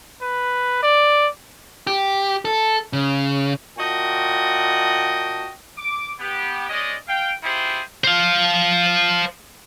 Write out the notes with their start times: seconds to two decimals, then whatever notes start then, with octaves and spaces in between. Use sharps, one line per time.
0.22 B4
0.83 D5
1.87 G4
2.45 A4
2.93 C#3
3.78 A#2 F#4 D#5 G5 A5
5.78 D6
6.20 B3 G4
6.70 G#3 C#4 D5 D#5
7.08 F5 G5
7.43 E4 F4 G4 G#4 C5
8.04 C5 F5